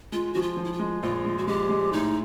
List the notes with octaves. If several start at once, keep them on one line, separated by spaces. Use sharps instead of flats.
G#3 F4
F3 F#4
F4
F3
E4
F4
G#3
A#1 F4
G#3
F#4
G#3 G4
G#3
A2 D#4